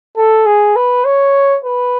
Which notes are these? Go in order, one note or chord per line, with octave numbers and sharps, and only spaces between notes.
A4
G#4
B4
C#5
B4